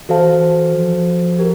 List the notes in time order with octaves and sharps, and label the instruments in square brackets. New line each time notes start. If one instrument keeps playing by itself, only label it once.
[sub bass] E3 [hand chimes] F#4 A4 C5 F5 A5
[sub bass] F3
[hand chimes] G4 A#4